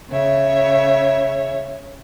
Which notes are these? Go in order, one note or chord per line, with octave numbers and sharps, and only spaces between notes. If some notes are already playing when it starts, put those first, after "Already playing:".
C#3 C#5 E5